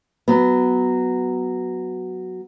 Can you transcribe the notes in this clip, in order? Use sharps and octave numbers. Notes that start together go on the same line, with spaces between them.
F#3 B3